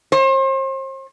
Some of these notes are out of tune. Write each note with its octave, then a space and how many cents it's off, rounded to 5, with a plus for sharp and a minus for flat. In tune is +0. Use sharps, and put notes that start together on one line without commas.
C5 +40